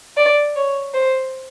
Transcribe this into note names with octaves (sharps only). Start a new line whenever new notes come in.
D5
C#5
C5